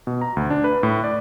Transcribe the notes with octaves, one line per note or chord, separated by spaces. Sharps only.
B2
A#5
D2
D4
B4
A2
D5